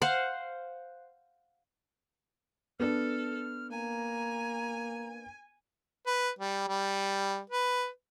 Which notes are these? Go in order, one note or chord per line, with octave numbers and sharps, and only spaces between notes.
C5 F5 F#5
B3 D4 A4 F6
A#3 G#5 A#5
B4
G3
G3
B4